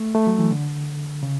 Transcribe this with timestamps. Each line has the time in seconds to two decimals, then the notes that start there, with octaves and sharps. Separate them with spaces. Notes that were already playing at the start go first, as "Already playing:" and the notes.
Already playing: A3
0.15 A3
0.27 F#3
0.39 E3
0.51 D3
1.23 C#3